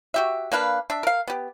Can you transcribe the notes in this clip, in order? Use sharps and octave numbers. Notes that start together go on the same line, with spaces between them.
F#4 G4 E5
A#3 D4 B4 F5
D4 E5
A#4 F5
B3 G4